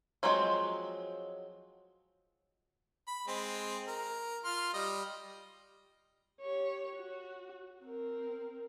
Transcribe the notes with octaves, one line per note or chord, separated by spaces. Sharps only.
F3 F#3 G#3 C4
B5
G#3 C4
A#4
F4 C6 F6
G3 D#5
G4 C#5
F#4
C4 A#4